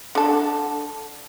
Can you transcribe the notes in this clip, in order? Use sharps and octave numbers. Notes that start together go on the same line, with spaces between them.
D3 A4